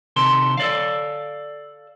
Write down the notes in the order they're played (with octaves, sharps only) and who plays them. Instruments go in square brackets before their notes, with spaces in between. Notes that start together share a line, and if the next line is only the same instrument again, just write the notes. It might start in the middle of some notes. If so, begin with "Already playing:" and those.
[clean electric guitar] C3 D#3 A4 C6
A4 D5 F5